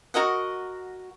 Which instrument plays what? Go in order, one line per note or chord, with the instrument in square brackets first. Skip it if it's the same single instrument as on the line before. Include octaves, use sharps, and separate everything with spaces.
[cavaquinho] F#4 A#4 D#5 F#5